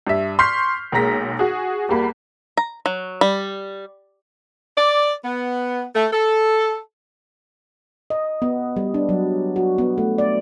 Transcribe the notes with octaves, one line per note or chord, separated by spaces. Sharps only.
G2 E5
C6 C#6 F6 G6 B6 C7
B1 G#3 A#3 A#5 A#6 B6
F#4 G#4
E2 G3 A#3 B5
A#5
F#3
G3
D5
B3
A3
A4
D#5
B3
G3
D4
F#3
F#4
B3
A3
D5